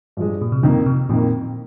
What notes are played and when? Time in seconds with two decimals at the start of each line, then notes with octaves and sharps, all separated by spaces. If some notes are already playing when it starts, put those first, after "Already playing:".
0.17 G2 F3 G#3
0.42 A#2
0.52 C3
0.63 F2 D3 D#3 A#3
0.86 C3
1.09 F2 A#2 D#3 A#3